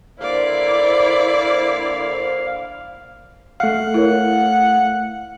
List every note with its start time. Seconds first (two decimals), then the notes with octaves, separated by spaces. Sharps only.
0.20 D3 A#3 E4 C5 D5 F5
3.60 A3 F5 F#5
3.94 E4 A#4 C#5